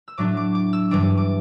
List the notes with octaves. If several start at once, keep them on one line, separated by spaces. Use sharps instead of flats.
E6
A2 F#3 A3 D4 D6
D6
D6
E6
G2 E3 G3 D4 D6
D6